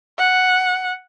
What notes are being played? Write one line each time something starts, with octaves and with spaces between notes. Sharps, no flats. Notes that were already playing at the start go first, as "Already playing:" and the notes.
F#5